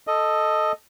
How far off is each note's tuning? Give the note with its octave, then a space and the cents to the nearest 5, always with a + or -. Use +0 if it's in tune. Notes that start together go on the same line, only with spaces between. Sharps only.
A4 +0 D#5 +0